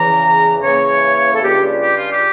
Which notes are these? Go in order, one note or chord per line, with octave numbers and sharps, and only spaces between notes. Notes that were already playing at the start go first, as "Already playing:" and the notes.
Already playing: E2 C#3 E3 A#5
C#3 E3 A#3 C#5
A4
C#2 C#3 G3 D4 F4 G4
G4
F4
G4